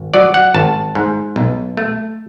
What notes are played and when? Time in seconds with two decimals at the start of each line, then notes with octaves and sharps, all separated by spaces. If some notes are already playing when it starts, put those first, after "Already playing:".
Already playing: G#1
0.14 F#3 D5
0.34 F#5
0.54 G#1 A5
0.95 G#2
1.36 B1
1.77 A3